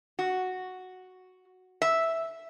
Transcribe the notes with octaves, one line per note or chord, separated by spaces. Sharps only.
F#4
E5